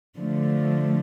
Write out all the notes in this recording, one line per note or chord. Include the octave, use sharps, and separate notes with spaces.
D3 F3 A3